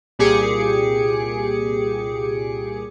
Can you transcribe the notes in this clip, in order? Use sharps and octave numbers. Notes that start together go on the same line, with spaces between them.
C2 A#2 G4 G#4 D6 C#7